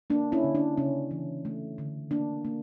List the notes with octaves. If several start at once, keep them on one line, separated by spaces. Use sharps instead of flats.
A#3 D4
C#4 E4
D3
D4
C#3 C#4
E3
A3
D3
A#3 D4
A#3